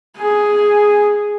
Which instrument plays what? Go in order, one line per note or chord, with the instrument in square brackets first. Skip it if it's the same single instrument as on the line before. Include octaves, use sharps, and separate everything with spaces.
[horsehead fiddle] G#4